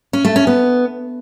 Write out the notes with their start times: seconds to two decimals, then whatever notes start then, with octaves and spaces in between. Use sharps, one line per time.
0.13 C#4
0.25 A3
0.36 C#4
0.47 B3